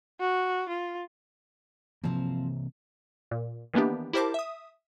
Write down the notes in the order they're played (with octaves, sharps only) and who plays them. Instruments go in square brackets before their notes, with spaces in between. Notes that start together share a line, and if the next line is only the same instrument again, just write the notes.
[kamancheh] F#4
F4
[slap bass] C3 E3 A#3 [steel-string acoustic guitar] F3 C4
[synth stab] A#2
D#3 E3 A#3 B3 D4 G4
E4 G4 A#4 C5 A5 D6
E5 D#6